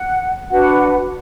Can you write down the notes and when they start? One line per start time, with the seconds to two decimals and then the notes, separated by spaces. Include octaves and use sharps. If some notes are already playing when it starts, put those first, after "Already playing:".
Already playing: F#5
0.50 D4 F#4 B4 F#5